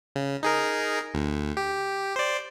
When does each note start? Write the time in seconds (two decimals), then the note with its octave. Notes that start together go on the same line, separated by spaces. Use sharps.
0.16 C#3
0.43 D#4 G#4 A#4
1.14 D2
1.57 G4
2.16 C5 D5